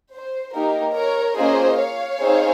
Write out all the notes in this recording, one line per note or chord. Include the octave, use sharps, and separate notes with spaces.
C5
A#3 D#4 G4 A#4
A#4 C#5
A#3 C#4 F4 G#4 C5 D#5
C#5 F5
C4 D#4 G#4